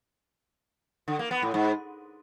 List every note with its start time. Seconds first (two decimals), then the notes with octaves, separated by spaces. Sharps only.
1.08 D3
1.19 A#3
1.31 B3
1.42 A2
1.54 G#2